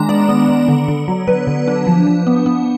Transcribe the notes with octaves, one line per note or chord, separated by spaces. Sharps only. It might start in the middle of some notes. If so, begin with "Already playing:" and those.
Already playing: D#3 G#3 D4 A#5
B3 D5
B3
B3
D3
D3
F#3
F#3 B4
D3
D4
F3
F3
B3
B3